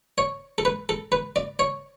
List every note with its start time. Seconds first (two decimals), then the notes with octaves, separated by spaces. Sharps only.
0.18 C#5
0.58 A4
0.65 B4
0.89 A4
1.12 B4
1.36 D5
1.59 C#5